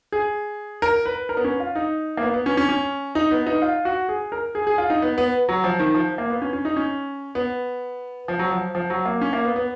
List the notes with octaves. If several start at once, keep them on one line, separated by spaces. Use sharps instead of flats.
G#4
A#4
B4
A#4
B3
C#4
F4
D#4
A#3
B3
B3
C#4
C#4
C#4
D#4
B3
D#4
F4
F#4
G#4
A#4
G#4
G#4
F4
D#4
B3
B3
F#3
F3
D#3
F3
A#3
B3
C#4
C#4
D#4
C#4
B3
F3
F#3
F3
F3
F#3
A#3
C#4
A#3
B3
B3